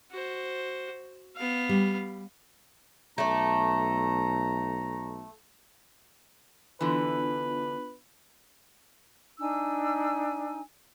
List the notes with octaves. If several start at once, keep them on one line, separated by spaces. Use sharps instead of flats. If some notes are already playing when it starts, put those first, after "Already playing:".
F#4 C5
B3 F5
G3
B1 A3 D5 A#5
D3 E3 B3 D4 F4 B4
D4 D#4 G#5 E6